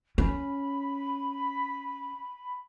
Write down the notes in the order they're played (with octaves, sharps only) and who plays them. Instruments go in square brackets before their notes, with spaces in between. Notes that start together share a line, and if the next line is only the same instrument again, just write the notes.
[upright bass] C#4 [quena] B5